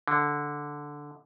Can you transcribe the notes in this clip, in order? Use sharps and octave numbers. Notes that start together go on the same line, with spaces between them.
D3